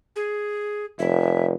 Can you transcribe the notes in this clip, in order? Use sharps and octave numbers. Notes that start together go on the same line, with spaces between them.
G#4
F1 E5